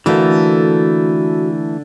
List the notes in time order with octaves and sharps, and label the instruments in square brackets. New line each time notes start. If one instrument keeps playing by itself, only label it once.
[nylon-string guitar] D3 A#3 [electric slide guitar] E3 A3 [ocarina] F#4